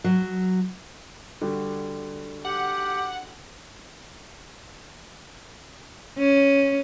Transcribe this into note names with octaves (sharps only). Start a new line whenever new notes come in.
F#3
D3 G3 F#4
G4 F#5
C#4